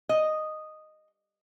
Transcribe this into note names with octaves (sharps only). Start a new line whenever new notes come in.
D#5